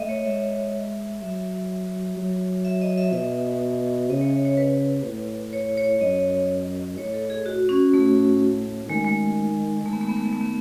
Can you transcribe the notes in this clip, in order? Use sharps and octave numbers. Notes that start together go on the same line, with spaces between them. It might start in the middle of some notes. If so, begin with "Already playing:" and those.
Already playing: A3 D#5 E5
C#5
G#3 E5
F#3 E5
F#3
E5
D#5
E5
B2 E5
C#3 D#5
C#5
C#5
B4
A2
C#5
C#5
F#2 D#5
A2 C#5
A4
G#4
F#4
C#4
A2 A3
D#3 G#3
G#3
D#3 A3
B3
A3
B3
A3
B3
A3
B3